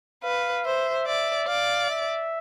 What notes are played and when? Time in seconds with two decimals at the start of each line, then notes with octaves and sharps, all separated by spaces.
0.24 B4 F5
0.65 C5 E5
1.07 D5 E5
1.48 D5 F5
1.90 E5